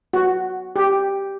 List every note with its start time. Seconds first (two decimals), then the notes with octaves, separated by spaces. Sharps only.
0.13 F#4
0.76 G4